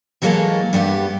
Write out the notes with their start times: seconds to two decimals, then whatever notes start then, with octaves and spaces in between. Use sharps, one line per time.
0.22 E3 F#3 G#3 A#3 A4 C#5
0.73 G2 G3 B3 G4